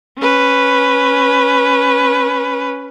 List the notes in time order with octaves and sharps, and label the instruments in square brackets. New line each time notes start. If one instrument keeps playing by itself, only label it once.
[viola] C#4 B4